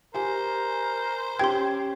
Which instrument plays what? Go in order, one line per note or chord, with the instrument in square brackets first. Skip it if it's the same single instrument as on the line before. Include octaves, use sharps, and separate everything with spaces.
[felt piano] G4 G#5 [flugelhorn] A#4 [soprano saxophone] C5
[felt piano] C#4 G4 G#6 [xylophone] G5 C6